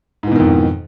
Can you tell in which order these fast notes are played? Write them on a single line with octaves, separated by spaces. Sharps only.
G#2 E3 B2 D#3 F2